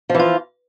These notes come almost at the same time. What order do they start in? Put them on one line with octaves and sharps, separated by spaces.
F3 E3 F4